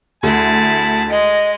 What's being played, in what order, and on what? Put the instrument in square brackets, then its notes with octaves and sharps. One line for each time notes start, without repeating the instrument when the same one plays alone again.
[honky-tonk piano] D2 [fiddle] E4 G#4 [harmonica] A5
[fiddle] G#3 [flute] D#5